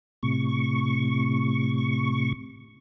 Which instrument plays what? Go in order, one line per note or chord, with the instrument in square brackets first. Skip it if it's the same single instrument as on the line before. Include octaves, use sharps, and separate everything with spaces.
[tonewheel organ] A2 C3 C#6